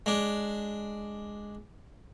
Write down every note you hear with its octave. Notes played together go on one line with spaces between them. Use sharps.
G#3 D4